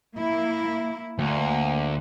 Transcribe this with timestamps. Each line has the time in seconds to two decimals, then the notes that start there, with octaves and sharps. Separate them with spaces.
0.17 A#3 E4
1.19 D2 A#3